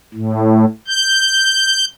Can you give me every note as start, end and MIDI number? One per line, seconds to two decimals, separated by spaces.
0.14 0.65 45
0.88 1.85 91